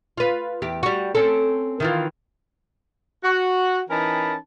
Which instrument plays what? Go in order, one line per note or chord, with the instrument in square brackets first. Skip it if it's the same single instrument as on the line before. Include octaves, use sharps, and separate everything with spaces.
[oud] F4 B4
E2 G4
G3 F#4
C4 C#4 A4
D#3 E3 F4
[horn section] F#4
E3 C#4 D#4 A#4 A5 B5